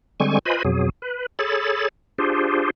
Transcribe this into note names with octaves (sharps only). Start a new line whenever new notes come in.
D3 G3 G#3 C4 G#5 C#6
F4 B4 C5 D#5 G#5 B5
F2 B2 F#3 G#4
B4
G#4 A4 C#5 B5 A6
D4 F4 G4 G#4 C5